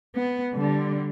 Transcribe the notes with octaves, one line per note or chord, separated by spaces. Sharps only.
B3
D3 G3